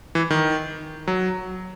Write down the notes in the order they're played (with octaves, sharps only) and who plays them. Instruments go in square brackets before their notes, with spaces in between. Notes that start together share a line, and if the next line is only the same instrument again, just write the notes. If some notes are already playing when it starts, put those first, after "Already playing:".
[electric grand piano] E3
D#3
F#3